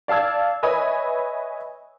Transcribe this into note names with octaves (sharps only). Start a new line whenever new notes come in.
D5 F5 A5 E6 G#6
B4 C#5 D#5 E5 G#5 B5